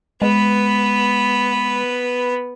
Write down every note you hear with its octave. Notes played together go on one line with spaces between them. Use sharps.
G#3 B3 B4